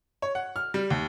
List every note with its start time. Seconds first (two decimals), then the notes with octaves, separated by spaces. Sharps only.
0.22 C#5
0.35 F#5
0.56 F6
0.74 G3
0.90 D#2